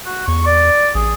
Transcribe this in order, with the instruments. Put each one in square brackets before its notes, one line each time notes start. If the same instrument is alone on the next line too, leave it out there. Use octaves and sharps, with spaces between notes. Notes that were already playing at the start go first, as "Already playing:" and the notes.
[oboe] F#4
[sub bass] E2 [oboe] C#6
[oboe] D5
[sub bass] A1 [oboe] G#4